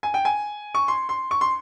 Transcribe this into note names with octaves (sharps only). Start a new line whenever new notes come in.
G#5
G5
G#5
C#6
C6
C6
C#6
C6